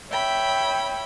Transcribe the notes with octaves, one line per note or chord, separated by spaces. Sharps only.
C#5 E5 G5 B5